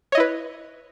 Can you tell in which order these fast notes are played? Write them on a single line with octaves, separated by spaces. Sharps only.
C#5 D#5 E4 B4